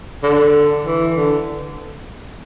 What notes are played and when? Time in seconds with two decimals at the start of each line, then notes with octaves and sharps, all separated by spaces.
0.23 D3
0.86 E3
1.17 D3